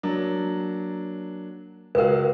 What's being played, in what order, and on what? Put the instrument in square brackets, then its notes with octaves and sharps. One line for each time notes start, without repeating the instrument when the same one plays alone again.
[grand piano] F#3 A#3 D4
[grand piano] C#2 F#4 F5 [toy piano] A#4 B4